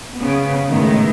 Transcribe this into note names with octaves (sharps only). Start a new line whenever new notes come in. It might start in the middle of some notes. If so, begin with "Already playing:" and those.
C#3 B3
A2 D#3 G#3 B3 E4